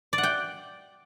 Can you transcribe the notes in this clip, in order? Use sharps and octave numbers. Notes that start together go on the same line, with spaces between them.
D5
F#5
G5